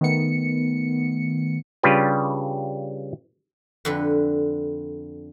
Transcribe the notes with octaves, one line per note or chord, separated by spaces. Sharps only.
D#3 A3 B3 C#7
C#3 G3 D4 F4 G4 B4
F2 D3 B4